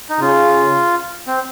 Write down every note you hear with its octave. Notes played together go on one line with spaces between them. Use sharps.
D#4
C#3 F4
C4